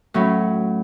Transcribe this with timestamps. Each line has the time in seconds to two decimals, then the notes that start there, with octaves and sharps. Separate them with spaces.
0.14 A2 F#3 C#4 E4